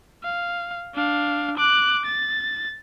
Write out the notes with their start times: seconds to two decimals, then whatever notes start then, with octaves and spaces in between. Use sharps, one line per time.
0.23 F5
0.94 D4 F5
1.57 D6 F#6
2.05 A6